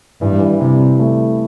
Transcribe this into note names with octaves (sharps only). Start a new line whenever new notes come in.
G2 E3
G3
E3
C3 G3
A3